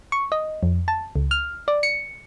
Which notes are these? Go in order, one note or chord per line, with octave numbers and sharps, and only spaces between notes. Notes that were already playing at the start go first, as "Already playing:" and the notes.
C#6
D#5
F2
A5
C#2
F6
D5
C#7